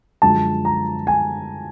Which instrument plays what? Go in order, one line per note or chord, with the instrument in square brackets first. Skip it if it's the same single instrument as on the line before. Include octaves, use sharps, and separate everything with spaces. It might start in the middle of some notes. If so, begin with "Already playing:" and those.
[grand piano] F#2 D3 F3 G#3 A5
A#5
G#5